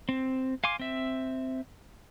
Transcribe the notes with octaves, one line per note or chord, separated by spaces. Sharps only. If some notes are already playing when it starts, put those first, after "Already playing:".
C4
F5 G#5 C6 D6
C4 E5